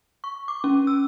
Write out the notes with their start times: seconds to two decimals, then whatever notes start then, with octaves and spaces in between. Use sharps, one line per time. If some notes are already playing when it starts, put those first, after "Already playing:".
0.24 C#6
0.48 D6
0.64 C#4
0.87 E6